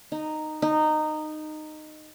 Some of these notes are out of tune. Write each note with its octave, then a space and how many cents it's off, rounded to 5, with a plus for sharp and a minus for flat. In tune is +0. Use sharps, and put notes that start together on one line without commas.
D#4 -10
D#4 -15